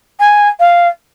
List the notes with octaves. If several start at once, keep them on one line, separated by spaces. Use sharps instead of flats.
G#5
F5